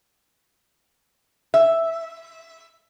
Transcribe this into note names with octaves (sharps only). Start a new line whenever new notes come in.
E5